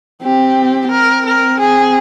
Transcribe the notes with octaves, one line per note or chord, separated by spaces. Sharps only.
C4 G4
C4 A#4
A#4
G#4